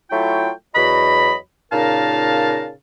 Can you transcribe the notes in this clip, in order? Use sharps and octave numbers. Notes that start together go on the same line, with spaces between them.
F#3 A3 E4 F4 G5
E2 F#3 F#4 D#5 B5
A#2 C#3 D#4 A#4 F5 A5